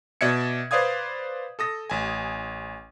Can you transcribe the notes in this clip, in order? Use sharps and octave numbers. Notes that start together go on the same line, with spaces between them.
B2 D5 E5 G#6 C#7
B4 C5 D5 F5 D#6 G#6
A4 D#6 A#6
A1 G#5